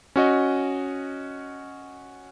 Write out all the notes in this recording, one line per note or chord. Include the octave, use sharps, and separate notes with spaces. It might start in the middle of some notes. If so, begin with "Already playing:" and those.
C#4 F#4 D#5